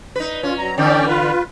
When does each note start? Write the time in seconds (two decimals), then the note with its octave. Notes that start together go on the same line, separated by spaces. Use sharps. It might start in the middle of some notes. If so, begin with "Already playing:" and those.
0.16 D#4 B4
0.43 C#4 F4
0.58 F#3 A#5
0.78 D3 E3 C#4 D5 G5
1.07 F4 B4